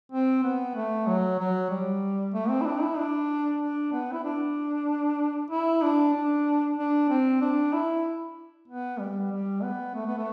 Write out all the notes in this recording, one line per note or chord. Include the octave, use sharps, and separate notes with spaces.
C4
B3
A3
F#3
F#3
G3
A3
C4
E4
D4
E4
D4
D4
B3
E4
D4
E4
D4
D4
D4
C4
D4
E4
B3
G3
G3
B3
A3
B3
A3